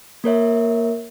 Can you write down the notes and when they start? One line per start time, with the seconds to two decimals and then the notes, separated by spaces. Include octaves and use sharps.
0.24 A#3 A#4 C#5 E5